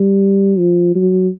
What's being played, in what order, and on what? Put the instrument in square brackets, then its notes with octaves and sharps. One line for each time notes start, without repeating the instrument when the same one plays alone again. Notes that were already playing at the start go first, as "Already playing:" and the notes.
Already playing: [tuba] G3
F3
F#3